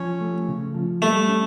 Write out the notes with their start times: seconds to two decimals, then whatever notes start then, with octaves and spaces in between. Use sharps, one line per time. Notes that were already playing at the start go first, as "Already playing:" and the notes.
Already playing: F3 C#4
0.21 A3
0.48 C#3
0.74 F3
1.02 G3 A3
1.28 C#4